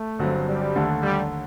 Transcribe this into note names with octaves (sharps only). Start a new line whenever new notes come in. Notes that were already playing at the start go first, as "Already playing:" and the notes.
Already playing: A3
G1 G2 F#3 C4
G3
D#2 D3 A3
G3